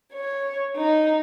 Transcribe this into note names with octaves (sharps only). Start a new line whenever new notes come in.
C#5
D#4